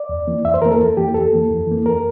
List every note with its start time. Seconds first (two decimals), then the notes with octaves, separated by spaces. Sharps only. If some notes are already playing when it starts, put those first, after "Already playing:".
Already playing: D5
0.09 E2
0.27 E3 A#3
0.45 F2 E5
0.54 C5
0.62 E3 A#3 A#4
0.71 A4
0.79 F2
0.97 E3 A#3 G4
1.14 F2 A4
1.33 E3 A#3
1.50 F2
1.67 E3 A#3
1.85 F2 A#4